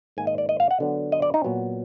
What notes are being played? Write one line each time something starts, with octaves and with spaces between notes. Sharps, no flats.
G#2 D#3 A#3 G#5
D#5
D5
D#5
F5
F#5
D3 F#3 B3
D#5
D5
D#4
A#2 F#3 B3